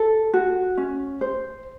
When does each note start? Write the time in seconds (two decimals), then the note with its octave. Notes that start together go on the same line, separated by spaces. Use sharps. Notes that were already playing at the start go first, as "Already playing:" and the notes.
Already playing: A4
0.34 F#4
0.78 C#4
1.21 C5